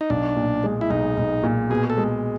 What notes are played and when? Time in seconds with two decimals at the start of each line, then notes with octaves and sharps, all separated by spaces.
0.01 D#4
0.10 B1 D4
0.36 A#2
0.64 G#3
0.81 E4
0.90 B1 D#4
1.17 B1
1.43 A#2
1.70 B2 G#4
1.90 A4
1.98 G#3